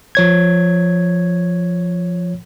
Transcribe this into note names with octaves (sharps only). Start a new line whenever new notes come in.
F3 C#5 G#6